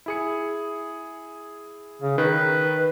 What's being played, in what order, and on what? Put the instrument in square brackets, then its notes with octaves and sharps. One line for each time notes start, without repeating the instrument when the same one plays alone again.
[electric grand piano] E4 G#4 C#7
[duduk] C#3
[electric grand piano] D#3 [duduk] B4